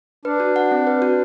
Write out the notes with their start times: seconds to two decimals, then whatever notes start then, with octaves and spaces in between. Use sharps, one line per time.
0.25 D4 B4
0.40 F#4
0.56 F#5
0.71 C4
0.87 B4
1.02 F#4